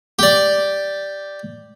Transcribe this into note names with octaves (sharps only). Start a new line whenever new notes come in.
G4 D5